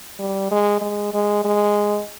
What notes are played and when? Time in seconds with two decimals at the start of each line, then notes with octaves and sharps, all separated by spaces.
0.19 G3
0.51 G#3
0.82 G#3
1.14 G#3
1.45 G#3